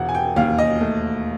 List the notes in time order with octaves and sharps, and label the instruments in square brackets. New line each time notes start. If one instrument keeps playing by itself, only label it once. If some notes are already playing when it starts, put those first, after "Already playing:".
Already playing: [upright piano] E1 F#5
G#5
G5
D#2 F5
D#5
A3